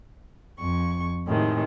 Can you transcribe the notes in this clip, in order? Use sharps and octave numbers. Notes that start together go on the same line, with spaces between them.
F2 C#6
A2 C3 D#3 G#3